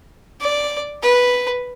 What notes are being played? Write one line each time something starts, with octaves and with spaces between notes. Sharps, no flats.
D5
B4